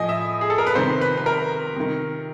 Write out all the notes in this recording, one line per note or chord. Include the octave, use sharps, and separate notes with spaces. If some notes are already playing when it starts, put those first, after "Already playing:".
Already playing: A2 F3 D#5 G#5
E5
G#4
A4
A#4
B4
C3 D#3 C5
B4
B4
A#4
C3 D#3